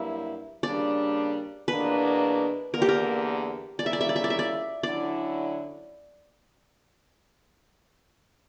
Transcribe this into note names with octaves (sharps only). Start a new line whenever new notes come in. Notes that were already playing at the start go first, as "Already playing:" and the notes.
Already playing: G2 F#3 A#3 E4 E5
C#3 G3 A#3 D4 D5
E2 B2 A#3 D4 B4
E2 D3 A#3 A#4
G4
A#4
C#3 G3 A#3 C#4 E4 D5
E5
D5
E5
D5
E5
D5
E5
D5
D3 F#3 C#4 E4 D5